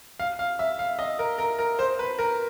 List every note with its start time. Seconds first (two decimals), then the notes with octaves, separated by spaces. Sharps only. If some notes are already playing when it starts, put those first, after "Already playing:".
0.20 F5
0.39 F5
0.59 E5
0.79 F5
0.99 D#5
1.19 A#4
1.38 A#4
1.59 A#4
1.79 C5
1.99 B4
2.19 A#4